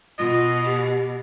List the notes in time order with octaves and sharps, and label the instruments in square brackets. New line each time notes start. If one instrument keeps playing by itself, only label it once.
[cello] B2 [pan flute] F4 [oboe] D#5
[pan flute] G4